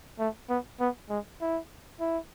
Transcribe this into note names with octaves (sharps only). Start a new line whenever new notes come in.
A3
B3
B3
G#3
E4
E4